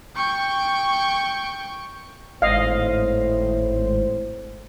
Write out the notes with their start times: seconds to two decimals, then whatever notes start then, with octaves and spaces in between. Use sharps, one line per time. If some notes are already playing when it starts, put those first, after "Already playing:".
0.16 G5 C#6
2.42 G#1 A2 C5 D#5 F5